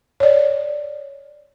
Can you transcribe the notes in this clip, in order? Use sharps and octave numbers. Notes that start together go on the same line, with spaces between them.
C#5 D5